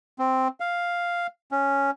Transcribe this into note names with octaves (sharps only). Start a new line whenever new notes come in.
C4
F5
C#4